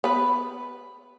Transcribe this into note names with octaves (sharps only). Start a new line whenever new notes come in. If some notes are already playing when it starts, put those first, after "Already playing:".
B3 B4